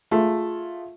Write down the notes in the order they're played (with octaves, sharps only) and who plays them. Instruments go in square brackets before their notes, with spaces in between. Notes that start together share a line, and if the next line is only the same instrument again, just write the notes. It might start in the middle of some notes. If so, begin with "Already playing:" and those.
[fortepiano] A3 [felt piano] F4 G#4 E5